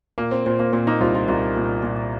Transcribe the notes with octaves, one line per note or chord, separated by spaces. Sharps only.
A#2 A#3
C4
A#2 C4
A#3
A#2 C4
A#3 D#4
C2 C4 F4
F4 A#4
C2 F4 A#4
A#2
A#2